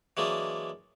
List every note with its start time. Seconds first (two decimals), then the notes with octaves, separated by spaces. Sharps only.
0.17 E3 F#3 G#3 A#3 D4